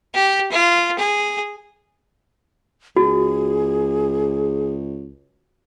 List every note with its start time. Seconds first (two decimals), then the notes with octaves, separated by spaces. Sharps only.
0.14 G4
0.51 F4
0.99 G#4
2.96 C#2 F#4 G#4